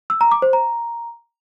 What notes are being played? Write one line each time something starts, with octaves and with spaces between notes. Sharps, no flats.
E6
A#5
D6
C5
A#5